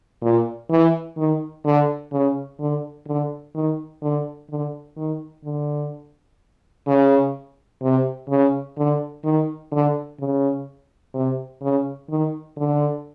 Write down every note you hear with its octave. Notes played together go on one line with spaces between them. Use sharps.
A#2
E3
D#3
D3
C#3
D3
D3
D#3
D3
D3
D#3
D3
C#3
C3
C#3
D3
D#3
D3
C#3
C3
C#3
D#3
D3